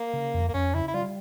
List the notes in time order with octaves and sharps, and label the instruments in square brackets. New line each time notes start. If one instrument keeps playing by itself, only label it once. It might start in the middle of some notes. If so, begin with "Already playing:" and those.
Already playing: [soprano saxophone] A#3
[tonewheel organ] C#3
F2
[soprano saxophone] A#3
[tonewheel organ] F2 [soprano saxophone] C#4
[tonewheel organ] C#3 [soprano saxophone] E4
[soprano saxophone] E4
[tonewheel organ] G3 [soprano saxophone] F4